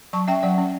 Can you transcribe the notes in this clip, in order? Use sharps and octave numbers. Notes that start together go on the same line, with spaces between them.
F#3 A5 C#6
C#4 E5 G5
F#3 D5 F#5
C#4